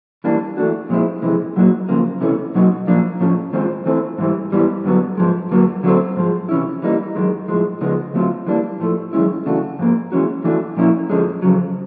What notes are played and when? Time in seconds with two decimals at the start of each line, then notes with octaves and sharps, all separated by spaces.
0.24 E3 G3 A#3 D4
0.57 E3 A3 D4 F#4
0.89 A#2 F3 G#3 C4 E4
1.22 F2 C3 E3 G#3
1.56 A#2 F#3 A#3 D#4 F#4
1.89 C#3 F3 A#3
2.21 C3 E3 A3 C#4
2.55 B2 F#3 A#3 D#4 F#4
2.87 A#2 F3 A#3 D4
3.20 A2 F3 A3 C#4 F4
3.53 D#3 G#3 C4 F4
3.86 E3 A3 C4
4.18 G#2 E3 G3
4.52 G#2 E3 G3 B3
4.84 G2 D3 F#3 B3
5.17 G#2 F3 G#3
5.51 G2 D3 F#3 A#3
5.83 D3 F#3 A3 C4
6.16 G#2 F3 G#3
6.49 C3 E3 G#3 C#4 E4
6.82 E3 G3 A#3 D#4
7.15 F#2 D#3 G#3
7.48 A2 F3 G#3
7.81 C#3 F3 G#3 B3 D#4
8.14 D3 F#3 A3 C4 F4
8.47 E3 G3 A#3 D4
8.80 A2 F3 A3
9.13 F#2 D#3 G#3 C#4 E4
9.46 C#3 E3 A3 D4 F#4
9.79 G#2 F3 A#3
10.12 E3 G#3 C#4 F#4
10.44 E3 A3 D4 F#4
10.76 A#2 F3 A#3 C#4 E4
11.10 F2 D3 F3 G#3 C#4
11.42 F2 C#3 F#3